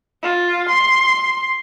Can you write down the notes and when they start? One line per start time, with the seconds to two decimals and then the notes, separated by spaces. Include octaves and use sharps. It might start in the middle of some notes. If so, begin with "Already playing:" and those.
0.23 F4
0.69 C6